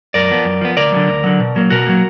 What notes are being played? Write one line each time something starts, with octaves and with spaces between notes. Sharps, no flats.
F#2 A#4 D5
F3 B3
F#2
F3 B3
D2 A#4 D5
D3 F#3
D2
D3 F#3
B2
F#3 A#3
B2 F#4 A#4
F#3 A#3